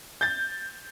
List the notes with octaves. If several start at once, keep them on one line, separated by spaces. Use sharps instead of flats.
G6 A6